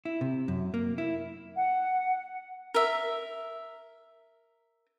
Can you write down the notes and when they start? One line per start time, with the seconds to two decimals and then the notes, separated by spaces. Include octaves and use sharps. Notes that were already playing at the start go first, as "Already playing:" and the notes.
0.05 E4
0.21 C3
0.48 F#2
0.74 A#3
0.98 E4
1.56 F#5
2.74 A#4 E5